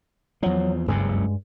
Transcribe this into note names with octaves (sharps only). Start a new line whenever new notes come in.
E2 F3 F#3
F#1 C#2 G2 C#3 G#3